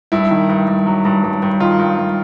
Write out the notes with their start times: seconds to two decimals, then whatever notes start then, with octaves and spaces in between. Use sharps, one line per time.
0.12 G2 E4
0.31 D#3
0.49 G2
0.68 G2
0.87 F#3
1.05 G2
1.24 G2
1.43 G2
1.60 D#3 F4
1.79 G2
1.98 G2